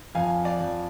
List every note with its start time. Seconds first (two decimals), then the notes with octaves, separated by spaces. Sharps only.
0.15 F2 F5 G#5
0.45 D5 F5
0.60 F2